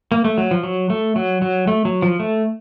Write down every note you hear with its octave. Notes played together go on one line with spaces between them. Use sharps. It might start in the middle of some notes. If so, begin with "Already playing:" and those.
A#3
A3
F#3
F3
F#3
A3
F#3
F#3
A3
F#3
F3
A3